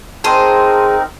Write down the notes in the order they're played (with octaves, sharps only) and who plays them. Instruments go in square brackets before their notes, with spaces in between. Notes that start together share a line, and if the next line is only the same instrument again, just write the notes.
[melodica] C4 D#4 A#4 [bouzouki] G#4 C5 [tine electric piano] A5 C6